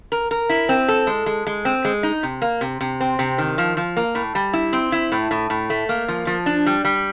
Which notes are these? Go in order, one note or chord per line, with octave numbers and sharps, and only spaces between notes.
A#4
A#4
E4
C4
A4
G#3
G#3
G#3
C4
G#3
D#4
C3
A#3
C3
C3
C4
C3
D#3
F3
F3
A#3
A2
G3
E4
C4
E4
A2
A2
A2
A3
A#3
F3
F3
D4
G3
G3